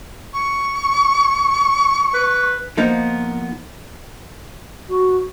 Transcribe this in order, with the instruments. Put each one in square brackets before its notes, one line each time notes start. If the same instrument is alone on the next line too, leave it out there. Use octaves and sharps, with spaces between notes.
[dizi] C#6
[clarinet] B4
[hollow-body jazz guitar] F3 A#3 B3 D#4
[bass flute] F#4